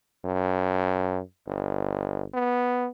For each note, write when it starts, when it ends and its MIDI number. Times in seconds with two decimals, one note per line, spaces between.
0.25 1.19 42
1.47 2.24 31
2.34 2.87 59